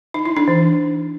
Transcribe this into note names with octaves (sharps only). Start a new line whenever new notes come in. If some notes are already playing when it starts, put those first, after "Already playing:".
D#4
E4
D4
E3